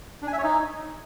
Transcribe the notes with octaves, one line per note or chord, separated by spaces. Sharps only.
D4
G#5
E5
C#5
D#4